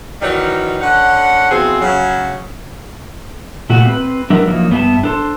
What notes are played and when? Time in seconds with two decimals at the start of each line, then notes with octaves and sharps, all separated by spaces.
0.21 D#3 E3 F#3 G3 D#4
0.82 D3 C#4 F#5
1.50 B2 E3 F3 C4 G#4
1.82 C#3 F#3
3.70 A#2 A3 F#4 G4
3.86 C4 B4
4.30 F#3 D4 A#4 B4 E5
4.47 F3 F#3 A#3 D#4
4.71 G2 B3 D4 F#4 E5 A5
5.03 D4 A4 C5